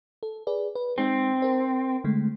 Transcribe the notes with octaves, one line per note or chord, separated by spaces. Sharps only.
A4
G#4 B4 D5
B4
G#3 C4 D#4
A#4 C5
D3 G#3 A3